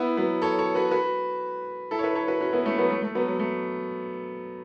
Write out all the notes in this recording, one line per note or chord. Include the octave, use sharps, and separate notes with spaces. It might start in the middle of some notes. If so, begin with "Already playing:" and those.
Already playing: B3 E4
F#3 B3
A4 C#5
A4 C#5
F#4 B4
F#4 B4
E4 A4
C#5
B4 E5
A4 C#5
F#4 B4
C#4 F#4
B3 E4
A3 C#4
F#3 B3
A3
A3
F#3 B3
F#3
A3